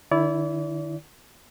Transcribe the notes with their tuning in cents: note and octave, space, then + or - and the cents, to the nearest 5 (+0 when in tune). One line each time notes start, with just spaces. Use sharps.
D#3 -45 E4 +0 D5 -35